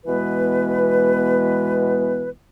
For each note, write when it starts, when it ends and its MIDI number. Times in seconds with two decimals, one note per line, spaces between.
0.06 2.31 47
0.06 2.31 52
0.06 2.31 56
0.06 2.31 59
0.06 2.31 71